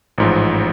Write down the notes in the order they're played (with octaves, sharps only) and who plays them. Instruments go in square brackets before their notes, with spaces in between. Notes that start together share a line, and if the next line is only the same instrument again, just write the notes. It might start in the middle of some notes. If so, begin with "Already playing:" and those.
[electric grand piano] A1 G#2 F3